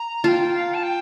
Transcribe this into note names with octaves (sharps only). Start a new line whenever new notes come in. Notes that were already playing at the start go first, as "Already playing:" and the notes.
Already playing: A#5
F4 G5 A5
F5
A5
G5